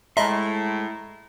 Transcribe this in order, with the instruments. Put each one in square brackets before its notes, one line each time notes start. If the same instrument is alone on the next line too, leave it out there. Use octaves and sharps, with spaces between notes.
[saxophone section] A2 [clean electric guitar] G#3 C6 [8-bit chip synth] D#5 E5 [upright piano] A#5